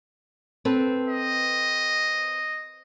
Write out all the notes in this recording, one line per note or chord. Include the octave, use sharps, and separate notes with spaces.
C4 A4 B4
D#5